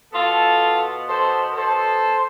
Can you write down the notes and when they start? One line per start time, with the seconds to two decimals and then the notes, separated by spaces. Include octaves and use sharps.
0.13 B2 B3 F4 A4
1.07 A4 C5
1.53 A4 C5